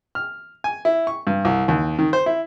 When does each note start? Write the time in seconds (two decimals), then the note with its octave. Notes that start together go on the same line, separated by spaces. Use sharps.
0.15 F6
0.64 G#5
0.85 E4
1.07 C#6
1.27 G2
1.45 C2
1.68 D#2
1.99 D#3
2.13 C5
2.26 E4